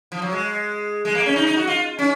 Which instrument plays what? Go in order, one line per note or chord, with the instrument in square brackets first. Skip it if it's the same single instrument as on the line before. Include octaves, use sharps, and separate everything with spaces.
[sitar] F3
F#3
G#3
G#3
A#3
C#4
D#4
D#4
F#4
F4
C#4